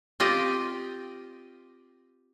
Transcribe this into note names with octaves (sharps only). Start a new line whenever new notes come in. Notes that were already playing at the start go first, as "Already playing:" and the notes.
C4 F4 G4 D#5